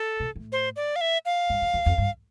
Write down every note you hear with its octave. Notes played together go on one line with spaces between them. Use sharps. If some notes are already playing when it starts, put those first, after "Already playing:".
Already playing: A4
B2
A2
C5
D5
F5
E5
F5
G2
F2
F2
F2
G2